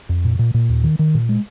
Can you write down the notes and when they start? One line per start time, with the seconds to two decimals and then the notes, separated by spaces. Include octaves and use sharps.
0.09 F2
0.24 A#2
0.39 A#2
0.54 A#2
0.69 D#2
0.84 D#3
0.99 D#3
1.14 A#2
1.29 G#3